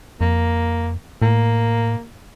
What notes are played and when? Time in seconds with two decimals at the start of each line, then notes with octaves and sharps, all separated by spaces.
0.21 F2 A#3
1.22 A2 A#3